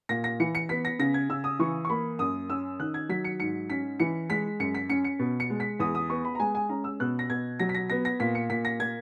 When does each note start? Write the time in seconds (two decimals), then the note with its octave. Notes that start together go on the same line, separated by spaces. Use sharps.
0.09 A#2 A#6
0.24 A#6
0.40 E3 C#7
0.55 C#7
0.69 B3 B6
0.85 A#6
0.99 C#3 A#6
1.14 G#6
1.29 C#3 E6
1.44 D#6
1.59 E3 C#6
1.85 C#6
1.90 A#3 B5
2.19 F#2 D#6
2.49 C#4 E6
2.79 D#3 F#6
2.94 G#6
3.09 F#3 B6
3.24 C#7
3.40 G#2 C#7
3.70 C#4 B6
4.00 E3 C#7
4.30 G#3 B6
4.60 F#2 C#7
4.75 B6
4.90 C#4 C#7
5.04 C#7
5.19 B2
5.40 C#7
5.50 G#3
5.60 B6
5.79 E2 D#6
5.95 D#6
6.09 B3 C#6
6.25 B5
6.35 A#5
6.40 G#3 G#5
6.55 G#5
6.69 C#4 A#5
6.84 E6
7.00 B2 F#6
7.19 A#6
7.30 B2 G#6
7.60 F#3 A#6
7.69 B6
7.75 A#6
7.90 B3 A#6
8.05 A#6
8.20 A#2 B6
8.35 C#7
8.50 A#2 B6
8.65 A#6
8.79 A#3 G#6